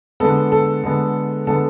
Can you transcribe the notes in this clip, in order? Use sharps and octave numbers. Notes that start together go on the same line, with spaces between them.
D3 G#3 B3 A4
A4
D3 G#3 B3
D3 G#3 B3 A4